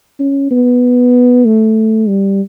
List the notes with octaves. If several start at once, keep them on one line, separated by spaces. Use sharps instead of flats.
C#4
B3
A3
G3